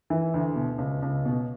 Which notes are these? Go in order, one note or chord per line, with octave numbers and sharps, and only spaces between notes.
E3
D2
B2
C#2
C#2
B2